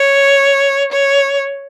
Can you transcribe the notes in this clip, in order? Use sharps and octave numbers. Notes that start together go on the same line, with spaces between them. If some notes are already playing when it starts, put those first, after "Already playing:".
Already playing: C#5
C#5